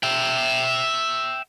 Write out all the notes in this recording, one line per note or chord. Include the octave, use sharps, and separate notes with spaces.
E5 G5